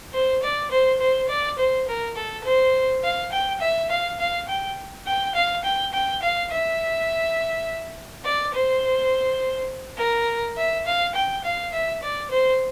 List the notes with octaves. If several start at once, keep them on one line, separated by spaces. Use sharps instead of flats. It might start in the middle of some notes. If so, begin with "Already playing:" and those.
C5
D5
C5
C5
D5
C5
A#4
A4
C5
F5
G5
E5
F5
F5
G5
G5
F5
G5
G5
F5
E5
D5
C5
A#4
E5
F5
G5
F5
E5
D5
C5